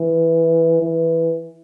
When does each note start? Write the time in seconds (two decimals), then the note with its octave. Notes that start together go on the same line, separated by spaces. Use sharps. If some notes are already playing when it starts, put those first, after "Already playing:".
Already playing: E3
0.82 E3